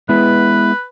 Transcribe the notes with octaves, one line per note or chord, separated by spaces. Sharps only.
G#3 B3 E4 B4